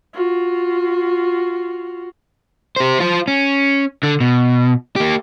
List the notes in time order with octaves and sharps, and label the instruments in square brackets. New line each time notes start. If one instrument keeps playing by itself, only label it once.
[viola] F4 F#4
[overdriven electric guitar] G4 C5
F4 C5
C#4
D3
B2
A#3 G4